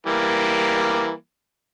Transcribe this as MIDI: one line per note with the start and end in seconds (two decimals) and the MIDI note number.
0.06 1.13 52
0.06 1.13 55
0.06 1.13 58